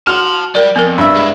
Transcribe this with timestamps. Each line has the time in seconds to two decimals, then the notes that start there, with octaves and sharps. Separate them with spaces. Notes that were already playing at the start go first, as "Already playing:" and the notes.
0.07 F#4 A5 C6 F6
0.55 G3 G4 A#4 D5
0.76 F2 B3 A#4
0.98 G2 E5
1.15 G#3 E4